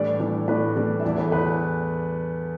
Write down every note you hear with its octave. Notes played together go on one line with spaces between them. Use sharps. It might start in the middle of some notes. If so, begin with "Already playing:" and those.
Already playing: A2 E3 G3 D4 D5
A2 E3 G3 D4
A2 E3 G3 D4 B4
A2 E3 G3 D4
E5
E2 E3 A3 D5
B4
E2 E3 A3 B4